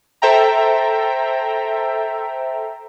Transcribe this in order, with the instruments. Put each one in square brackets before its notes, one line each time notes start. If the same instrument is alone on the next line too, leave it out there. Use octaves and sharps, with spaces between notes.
[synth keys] A4 C5 E5 G5 A#5